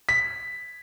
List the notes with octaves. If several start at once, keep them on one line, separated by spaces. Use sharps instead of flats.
B6